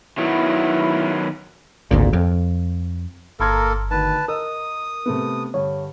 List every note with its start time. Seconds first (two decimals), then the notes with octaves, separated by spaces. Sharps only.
0.18 D#3 F#3 B3 E4
1.91 G#1 D2 A#2
2.13 F2
3.40 G1 A#3 A4 A#4 B5 C6 G#6
3.91 D2 D#3 B4 A5
4.28 A#4 D#5 D#6 E6
5.06 C3 A3 B3
5.54 G2 D3 C#5